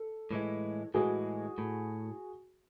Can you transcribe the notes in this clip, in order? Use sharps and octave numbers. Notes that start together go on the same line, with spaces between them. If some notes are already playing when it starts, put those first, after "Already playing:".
Already playing: A4
A2 E3 G#3
A2 E3 G#3 F#4 G#4
A2